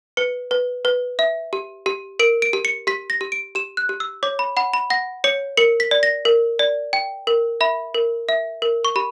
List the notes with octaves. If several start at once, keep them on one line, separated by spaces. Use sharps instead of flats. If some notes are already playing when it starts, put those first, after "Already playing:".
B4 C#7
B4
B4
E5
G4
G4
A#4 D7
D7
G4
C#7
G4 B6
A#6
G4
D7
G4 E7
F#6
G4
E6
C#5 D6
B5
F#5 B5
B5
F#5 A#6
C#5 C#7
A#4 C#7
B6
D5
A#6
A#4
D5
G5
A#4
E5 B5
A#4
E5
A#4
C#6
G4 B5